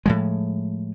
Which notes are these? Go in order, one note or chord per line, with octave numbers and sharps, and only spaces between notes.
A2 F3 G#3